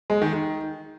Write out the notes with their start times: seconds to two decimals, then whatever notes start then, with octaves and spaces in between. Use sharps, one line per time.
0.10 G#3
0.22 D#3
0.33 D#3